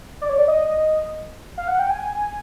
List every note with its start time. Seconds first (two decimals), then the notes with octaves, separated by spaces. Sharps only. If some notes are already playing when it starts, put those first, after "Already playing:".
0.21 D5
0.29 C#5
0.38 D5
0.48 D#5
1.58 F5
1.68 F#5
1.79 G5
1.90 G#5